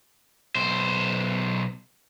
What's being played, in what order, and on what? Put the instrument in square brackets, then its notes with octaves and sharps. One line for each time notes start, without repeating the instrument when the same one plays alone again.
[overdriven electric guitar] B1 C5